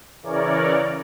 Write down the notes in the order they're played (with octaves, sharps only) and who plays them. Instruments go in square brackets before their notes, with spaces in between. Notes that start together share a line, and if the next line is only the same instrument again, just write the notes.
[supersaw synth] C#3 E3 A#4 C#5 D5